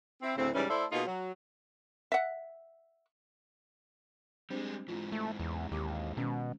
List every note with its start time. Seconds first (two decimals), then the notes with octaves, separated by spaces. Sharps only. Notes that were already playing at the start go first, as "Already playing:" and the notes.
0.22 C4 E4
0.36 D2 A2 C#3 C4
0.53 G#2 C#3 E3 G3 C#4
0.69 A3 E4 A4 C5 D5 E5
0.91 B2 A#3 D#4 F4 G#4
1.06 F#3
2.12 E5 F#5
4.50 G3 G#3 C4 D4 C5
4.89 G#2 E3 F4
5.12 A3
5.40 E2
5.72 D#2 G4 D6
6.17 B2 D#3 G#3 C#4